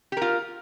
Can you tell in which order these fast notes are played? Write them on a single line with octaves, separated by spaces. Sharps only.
G4 A#4 F4